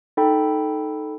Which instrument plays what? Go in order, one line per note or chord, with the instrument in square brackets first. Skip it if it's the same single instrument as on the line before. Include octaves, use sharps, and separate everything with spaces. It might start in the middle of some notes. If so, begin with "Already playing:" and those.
[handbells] D#4 A4 G5 B5